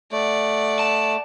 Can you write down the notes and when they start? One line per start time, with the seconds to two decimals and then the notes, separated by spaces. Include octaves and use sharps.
0.12 A3 D5 F#5
0.79 A5